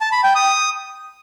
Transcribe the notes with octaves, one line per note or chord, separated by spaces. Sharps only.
A5
B5
G5
D#6